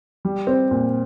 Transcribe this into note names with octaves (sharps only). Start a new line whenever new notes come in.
G3
C4
A#2